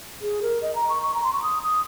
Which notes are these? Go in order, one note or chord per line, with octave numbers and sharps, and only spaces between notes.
G#4
A#4
D#5
A#5
C#6
C#6
A#5
C6
C#6
D#6
D#6